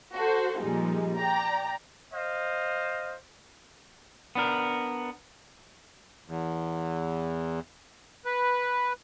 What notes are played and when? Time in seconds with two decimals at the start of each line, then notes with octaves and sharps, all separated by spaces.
0.15 F#4 A4 C5
0.60 A#2 F3 G3 G#3 D#4
1.17 D5 G5 A#5
2.13 C5 D#5 F5
4.35 B3 D4 A#4
6.26 E2
8.25 B4